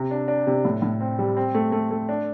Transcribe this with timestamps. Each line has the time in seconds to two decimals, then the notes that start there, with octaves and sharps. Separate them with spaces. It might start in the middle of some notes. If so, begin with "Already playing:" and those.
Already playing: C3
0.11 D4
0.28 D4
0.47 C3
0.65 A2
0.82 A2
1.01 C4
1.19 G3
1.37 C4
1.55 A3
1.72 A3
1.91 A3
2.09 D4